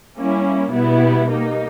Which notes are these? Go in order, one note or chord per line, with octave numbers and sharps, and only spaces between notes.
G3 A#3 C#4 E4
B2 G3 B3 E4
G3 A#3 D#4